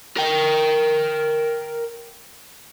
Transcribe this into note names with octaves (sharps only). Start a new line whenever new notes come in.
A#4 G5